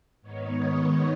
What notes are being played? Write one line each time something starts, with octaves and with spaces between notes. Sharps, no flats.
G#2 D#3 B3 D#4 C#5